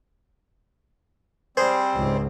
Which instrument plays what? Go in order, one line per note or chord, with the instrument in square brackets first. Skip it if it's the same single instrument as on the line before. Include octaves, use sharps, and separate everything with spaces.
[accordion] G3 C4 [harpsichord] G#4 C5
[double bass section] C#2 G#2